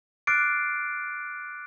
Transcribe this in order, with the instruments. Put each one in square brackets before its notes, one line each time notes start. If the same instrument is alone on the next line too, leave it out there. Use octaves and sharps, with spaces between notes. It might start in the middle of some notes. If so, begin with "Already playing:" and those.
[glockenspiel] D6 F6 F#6 A6 C7 D7